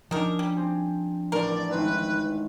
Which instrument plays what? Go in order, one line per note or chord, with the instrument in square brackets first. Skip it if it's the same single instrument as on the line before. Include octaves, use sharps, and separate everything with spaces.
[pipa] D#3 A#4 [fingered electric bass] F3 [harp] C#4 D4
[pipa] G3
[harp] C4 G4 G#4
[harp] A1 [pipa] A#4 [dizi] D5
[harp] G#1 C4 E4 [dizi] B4